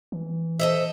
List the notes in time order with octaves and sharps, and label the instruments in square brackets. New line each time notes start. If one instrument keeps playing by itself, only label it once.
[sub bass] E3
[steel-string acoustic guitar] A4 D#5 E5 [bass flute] C5